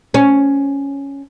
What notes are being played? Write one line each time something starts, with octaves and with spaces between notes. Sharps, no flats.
C#4